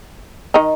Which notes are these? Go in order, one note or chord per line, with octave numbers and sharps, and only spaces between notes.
D#3 D#4